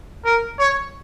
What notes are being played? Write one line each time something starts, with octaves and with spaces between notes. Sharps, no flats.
A#4
C#5